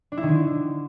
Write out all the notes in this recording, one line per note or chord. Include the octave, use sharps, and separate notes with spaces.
D4
E4
D#3
D3